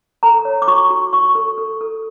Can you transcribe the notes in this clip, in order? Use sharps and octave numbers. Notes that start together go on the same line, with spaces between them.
A4 A#5
C#5
D6
F#4 C#6
F#4
F#4 C#6
A4
A4
A4